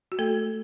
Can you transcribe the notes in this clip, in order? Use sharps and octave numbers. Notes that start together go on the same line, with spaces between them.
F#4
A3 A4